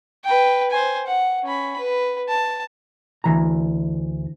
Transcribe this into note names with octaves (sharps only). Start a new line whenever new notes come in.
B4 G5
C5 G#5
F#5
C#4 B5
B4
A5
D2 E3 A#5